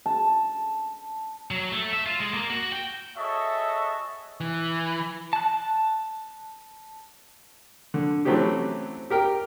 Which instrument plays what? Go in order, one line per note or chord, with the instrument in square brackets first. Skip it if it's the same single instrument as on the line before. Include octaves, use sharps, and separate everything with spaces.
[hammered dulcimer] A5
[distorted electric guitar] F#3
A3
E5
F4
G#3
A#3
F#4
G5
[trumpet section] F#4 G#4 A4 C#5 D#5 E5
[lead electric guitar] E3
[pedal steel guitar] A5 F#6
[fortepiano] D3
E3 F#3 A3 C4 C#4 G4
G4 A#4 G5